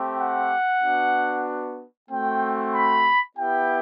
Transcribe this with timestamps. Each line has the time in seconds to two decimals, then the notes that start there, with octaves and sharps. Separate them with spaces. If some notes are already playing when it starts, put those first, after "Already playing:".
Already playing: A3 C4 G4
0.18 F#5
0.81 B3 D4 F#4
2.09 A3 C4 F#4 G5
2.73 B5
3.36 B3 E4 G4 G5